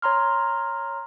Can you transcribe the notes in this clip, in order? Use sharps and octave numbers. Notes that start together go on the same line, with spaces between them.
C#5 A#5 C6 F6